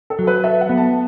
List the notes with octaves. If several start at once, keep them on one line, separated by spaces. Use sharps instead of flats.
A4
F#3
B4
A4 E5
F#5
B3
A5